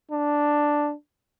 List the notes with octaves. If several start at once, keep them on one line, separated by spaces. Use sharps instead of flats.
D4